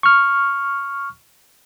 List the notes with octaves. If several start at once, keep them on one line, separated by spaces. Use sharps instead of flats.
C#6 F6